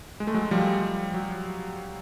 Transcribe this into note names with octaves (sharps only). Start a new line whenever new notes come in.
G#3
A3
F#3 G#3
F3 G3
F#3